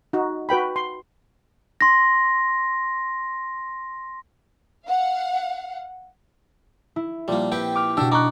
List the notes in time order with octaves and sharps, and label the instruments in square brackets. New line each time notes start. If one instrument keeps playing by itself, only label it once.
[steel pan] D#4 F#4
F#4 B4 G5 B5
C6
[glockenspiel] C6 A#6
[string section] F5 F#5
[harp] E4
[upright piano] A#2 F3 [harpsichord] G3 A#3
[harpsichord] C4 G4 B4 [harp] G5
[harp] D6 F6
[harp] B2 D4 [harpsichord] F#4 G4 [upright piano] E6
[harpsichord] D#4 [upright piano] A#5 C#6 F#6 [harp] D6